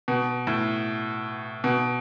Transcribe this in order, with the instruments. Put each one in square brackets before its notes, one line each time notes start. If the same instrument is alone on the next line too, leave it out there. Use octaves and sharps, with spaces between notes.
[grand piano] B2
A2
B2